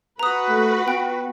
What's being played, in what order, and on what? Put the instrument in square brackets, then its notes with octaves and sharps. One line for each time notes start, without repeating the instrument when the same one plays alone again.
[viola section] F#4 B4 [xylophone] A#5 D#6
[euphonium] A3
[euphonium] B3 [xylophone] G5